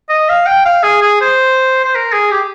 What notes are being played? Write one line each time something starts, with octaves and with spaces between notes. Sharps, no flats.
D#5
F5
G5
F5
G#4
G#4
C5
C5
A#4
G#4
G4